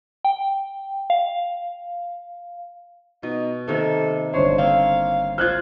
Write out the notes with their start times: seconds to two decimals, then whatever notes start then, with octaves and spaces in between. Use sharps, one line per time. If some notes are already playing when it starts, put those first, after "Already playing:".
0.25 G5
1.10 F5
3.23 B2 D#4
3.68 C3 D#3 A#3 A4
4.34 G1 D4 C5 C#5
4.58 A#3 C4 F5
5.38 F4 C5 F6 F#6 G#6